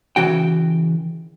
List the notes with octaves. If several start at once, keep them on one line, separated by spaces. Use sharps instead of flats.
C#3 E3 F#4 G5